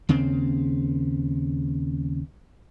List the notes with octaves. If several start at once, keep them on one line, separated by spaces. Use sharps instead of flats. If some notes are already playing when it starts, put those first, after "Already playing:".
D#2 C#3 C4